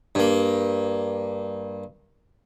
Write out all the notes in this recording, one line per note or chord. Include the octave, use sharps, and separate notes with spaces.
G2 A#3